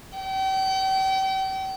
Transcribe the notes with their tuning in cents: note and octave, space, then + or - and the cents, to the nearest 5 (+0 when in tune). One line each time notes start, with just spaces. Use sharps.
G5 -40